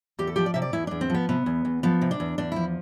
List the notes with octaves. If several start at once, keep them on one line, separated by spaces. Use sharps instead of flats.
E2 G4
A4
F3 G4
D5
C3 E5
D5
E2 E4
E2 D4
C4
F3 B3
C3 B3
E2
E2
F3 B3
C3
D4
E2
E2 D4
F3 E4